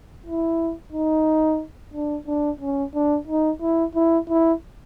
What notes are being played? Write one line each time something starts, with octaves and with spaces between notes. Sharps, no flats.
E4
D#4
D4
D4
C#4
D4
D#4
E4
E4
E4